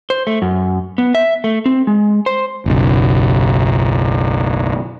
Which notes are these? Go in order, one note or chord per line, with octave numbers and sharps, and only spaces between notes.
C5
A3
F#2
B3
E5
A3
C4
G#3
C5
F#1 B1